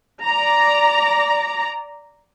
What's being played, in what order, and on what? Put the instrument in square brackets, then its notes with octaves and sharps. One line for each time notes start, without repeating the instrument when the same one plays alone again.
[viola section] D5 A#5